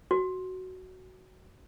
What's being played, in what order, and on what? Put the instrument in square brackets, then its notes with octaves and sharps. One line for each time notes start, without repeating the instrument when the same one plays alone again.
[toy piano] F#4